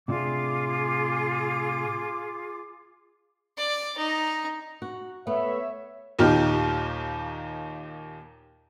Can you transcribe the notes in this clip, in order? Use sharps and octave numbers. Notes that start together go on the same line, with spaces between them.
A2 C3 D4 F4 G#4 D6
D5
D#4
F#4
A3 B3 C#5 E5
D#2 A#2 D#4 G4 F6